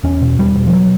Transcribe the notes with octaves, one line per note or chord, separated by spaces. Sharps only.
E2 C#4
B2
E2 G3
B2
F3
F#3